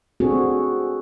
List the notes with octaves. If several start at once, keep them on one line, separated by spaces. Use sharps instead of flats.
C4 D4 F#4 G#4 A4